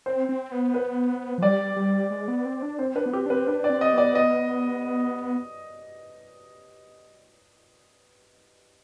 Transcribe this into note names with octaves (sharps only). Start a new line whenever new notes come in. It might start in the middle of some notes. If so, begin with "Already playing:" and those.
C4 C5
C4
B3
B4
F3
G3 D5
G3
G#3
B3
C4
D4
C4 C5
D4 B4
B3
C4 G4
D4
C4 B4
D4 B4
D5
C4
D#5
B3 D5
D#5